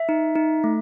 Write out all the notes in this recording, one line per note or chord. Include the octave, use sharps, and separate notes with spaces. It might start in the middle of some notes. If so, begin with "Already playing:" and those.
Already playing: E5
D#4
D#4
A3